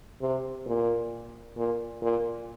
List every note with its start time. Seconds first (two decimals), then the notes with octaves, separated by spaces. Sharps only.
0.21 C3
0.66 A#2
1.57 A#2
2.02 A#2